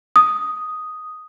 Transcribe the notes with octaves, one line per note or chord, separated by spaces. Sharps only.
D#6